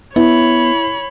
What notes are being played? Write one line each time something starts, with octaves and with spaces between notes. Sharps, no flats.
B3 E4 C#5 B5